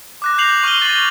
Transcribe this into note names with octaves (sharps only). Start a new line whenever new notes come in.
D6 F#6 A#6
G6 C7 F7 F#7
C#6 F6 D#7 G7
A6 F#7